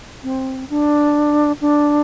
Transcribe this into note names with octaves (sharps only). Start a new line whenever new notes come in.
C4
D4
D4